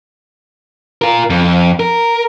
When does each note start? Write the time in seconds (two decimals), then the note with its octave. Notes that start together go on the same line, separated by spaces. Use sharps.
1.02 F4 A#4
1.30 F2
1.80 A#4